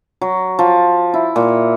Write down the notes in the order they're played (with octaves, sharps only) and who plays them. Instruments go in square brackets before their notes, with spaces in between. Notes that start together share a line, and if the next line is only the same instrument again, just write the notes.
[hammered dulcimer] F#3
F3
E4
A#2